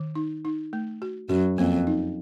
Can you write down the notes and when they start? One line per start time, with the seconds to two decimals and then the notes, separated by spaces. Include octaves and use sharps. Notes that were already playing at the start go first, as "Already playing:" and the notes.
Already playing: D#3
0.15 D#4
0.45 D#4
0.73 A3
1.02 F#4
1.29 F#2 F#4
1.58 F2 A#3
1.87 D#4